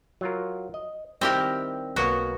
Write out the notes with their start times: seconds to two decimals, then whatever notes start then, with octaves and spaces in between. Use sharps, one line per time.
0.21 F#3 F4 A#4
0.74 D#5
1.21 D#3 G3 C4 E4 G4 A#4
1.96 B1 A#3 B3 F#4 A#5